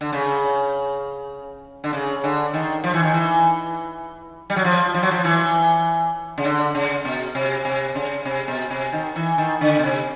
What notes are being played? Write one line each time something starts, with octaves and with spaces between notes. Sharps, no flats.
D3
C#3
D3
C#3
D3
D#3
F3
E3
D#3
E3
G3
F#3
F3
F3
F#3
F3
E3
C#3
D3
C#3
B2
C3
C3
C#3
C3
B2
C3
D#3
E3
D#3
D3
B2
C3